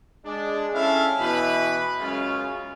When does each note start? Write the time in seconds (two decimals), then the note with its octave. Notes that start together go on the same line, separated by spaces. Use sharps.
0.25 G#3 D4
0.74 C#4 E4 A4 E5 F5
1.19 B2 E3 E4 B4 B5
2.00 F#2 C#3 G#3 C#4 F4